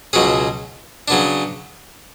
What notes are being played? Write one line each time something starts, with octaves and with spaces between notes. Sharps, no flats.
C#2 B2 F#3 C#4 G#4
C#3 F#3 B3 D4